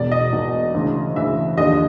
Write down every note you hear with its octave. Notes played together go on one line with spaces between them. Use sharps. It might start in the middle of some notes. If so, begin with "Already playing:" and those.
Already playing: E1 E2 B2 D5
D#5
E1 E2 B2
D2 C#3 E3
D2 C#3 E3 E5
D#2 D3 F3 D#5